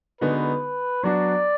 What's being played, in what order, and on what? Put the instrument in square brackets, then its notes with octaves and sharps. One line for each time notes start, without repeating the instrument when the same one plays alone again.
[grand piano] D3 G#3 B3 D#4 F#4 [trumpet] B4
[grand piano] F#3 B3 D4 F#4 [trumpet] D5